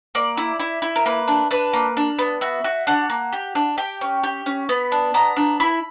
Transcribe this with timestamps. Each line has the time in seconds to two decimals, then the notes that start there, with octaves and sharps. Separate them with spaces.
0.15 A#3 D5
0.37 E4
0.59 E4
0.82 E4
0.96 A#4
1.06 A#3 B4
1.28 D4
1.51 D4 B4
1.73 A#3
1.97 D4
2.19 B3
2.41 F#4 E5
2.64 F#4
2.87 D4 F#5
3.10 A#3
3.33 G4
3.55 D4
3.78 G4 G5
4.01 C#4
4.23 G4
4.46 C#4
4.69 B3 B5
4.92 D4
5.14 B3 A#5
5.37 D4
5.60 E4 B5